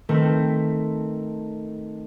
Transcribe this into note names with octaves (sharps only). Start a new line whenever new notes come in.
D#3 A3 C4 B4